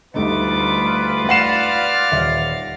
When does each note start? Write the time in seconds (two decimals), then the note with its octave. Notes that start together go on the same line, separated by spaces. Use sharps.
0.14 D2 G3 A3 D#4 F4 B4 D6
1.29 D5 F5 F#5 A#6 C7 E7
2.12 D#1 E5